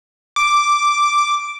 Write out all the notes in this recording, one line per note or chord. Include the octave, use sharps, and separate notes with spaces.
D6